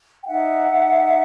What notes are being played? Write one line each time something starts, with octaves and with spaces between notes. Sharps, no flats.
G5
D#4 E5 F#5
D#4